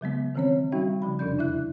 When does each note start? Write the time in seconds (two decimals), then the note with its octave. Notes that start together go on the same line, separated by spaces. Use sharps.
0.01 C#3 F#3 G#3 B3
0.35 D#3 E3 F#3 C4 C#4 C#5
0.72 G3 C#4 D#4 F#4 E5 G5
1.02 C#3 F3 B5
1.19 F2 C3 C#4 D4 D5 G6
1.38 E2 E4 E5 F#6